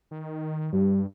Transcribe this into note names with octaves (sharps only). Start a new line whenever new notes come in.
D#3
G2 G3